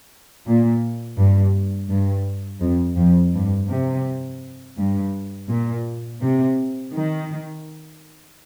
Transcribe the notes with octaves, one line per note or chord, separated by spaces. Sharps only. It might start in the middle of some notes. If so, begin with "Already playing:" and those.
A#2
G2
G2
F2
F2
G2
C3
G2
A#2
C3
D#3